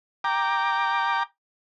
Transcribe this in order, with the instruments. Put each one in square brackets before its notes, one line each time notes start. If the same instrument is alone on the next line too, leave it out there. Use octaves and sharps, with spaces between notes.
[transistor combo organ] G5 A#5 D6